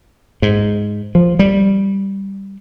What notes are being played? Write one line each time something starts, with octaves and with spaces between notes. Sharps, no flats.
G#2
F3
G3